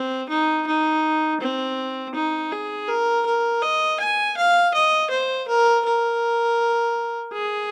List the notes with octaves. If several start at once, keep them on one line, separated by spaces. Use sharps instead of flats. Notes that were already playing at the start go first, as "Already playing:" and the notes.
Already playing: C4
D#4
D#4
C4
D#4
G#4
A#4
A#4
D#5
G#5
F5
D#5
C5
A#4
A#4
G#4